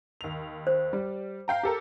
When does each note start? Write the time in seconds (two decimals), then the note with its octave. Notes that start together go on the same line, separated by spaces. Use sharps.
0.21 D#2 F7
0.67 C5
0.93 G3
1.48 F5 G5 A#5
1.63 G4 A4 A#4